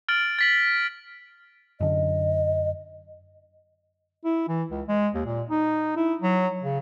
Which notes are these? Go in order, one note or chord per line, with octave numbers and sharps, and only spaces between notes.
F6 A6 D7 F#7
A6 B6 F#7
F#2 D3 D#5
E4
E3
C#2
G#3
D#2
A#2
D#4
E4
F#3
C#3